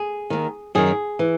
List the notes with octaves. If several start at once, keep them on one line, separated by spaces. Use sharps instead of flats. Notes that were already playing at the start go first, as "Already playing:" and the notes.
Already playing: G#4
D#2 D#3
F#2 D#3 G#4
E3